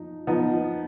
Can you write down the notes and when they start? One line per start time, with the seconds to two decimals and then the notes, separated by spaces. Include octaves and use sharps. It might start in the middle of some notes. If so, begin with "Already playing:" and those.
Already playing: F3 D#4
0.27 F3 B3 D#4